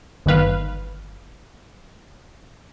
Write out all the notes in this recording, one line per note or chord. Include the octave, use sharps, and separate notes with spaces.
G1 D#3 B4 F5